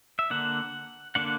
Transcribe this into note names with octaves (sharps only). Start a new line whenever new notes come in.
E5
D3 A#3 D4 F#5
D3 A#3 D4 F#5